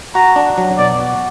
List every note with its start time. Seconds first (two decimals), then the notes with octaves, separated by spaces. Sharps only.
0.15 F#4 A#5
0.36 D4
0.58 F#3
0.78 B2 D5
1.00 F#4